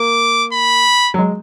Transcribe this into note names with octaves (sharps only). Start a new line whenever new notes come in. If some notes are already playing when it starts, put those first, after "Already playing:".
Already playing: A#3 D6
B5
F#3
G#3